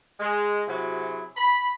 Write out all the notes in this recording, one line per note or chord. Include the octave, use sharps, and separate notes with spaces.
G#3
C3 F#3 E4 F#4 G#4
B5